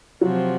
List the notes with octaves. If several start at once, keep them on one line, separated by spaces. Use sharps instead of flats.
C3 F3 F#3 C4 F#4